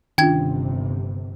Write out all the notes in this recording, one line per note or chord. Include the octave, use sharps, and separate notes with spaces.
G1 C3 D#3 C#4 D4 F4 G5 G#6